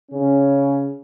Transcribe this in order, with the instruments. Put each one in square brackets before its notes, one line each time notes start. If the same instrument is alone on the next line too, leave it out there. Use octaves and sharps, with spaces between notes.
[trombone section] C#3 C#4